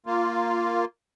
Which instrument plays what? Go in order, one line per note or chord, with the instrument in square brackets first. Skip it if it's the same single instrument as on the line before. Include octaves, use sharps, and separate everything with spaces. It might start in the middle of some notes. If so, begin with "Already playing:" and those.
[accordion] A#3 F4